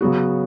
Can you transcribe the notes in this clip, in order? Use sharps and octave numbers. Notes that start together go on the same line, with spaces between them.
C#3 F#3 B3 F#4